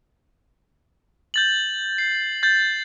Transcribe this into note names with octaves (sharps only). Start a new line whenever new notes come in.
G6 A6 F#7
C7
G6 A6